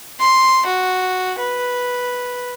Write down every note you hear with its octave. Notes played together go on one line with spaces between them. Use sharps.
C6
F#4
B4